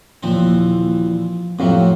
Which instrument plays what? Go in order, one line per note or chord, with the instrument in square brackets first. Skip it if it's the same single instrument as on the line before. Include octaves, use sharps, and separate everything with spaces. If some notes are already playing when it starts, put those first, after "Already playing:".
[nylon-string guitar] D#2 A#2 E3 [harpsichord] F3 C4
[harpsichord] F2 A2 F#3 [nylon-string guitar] C4 G4 F5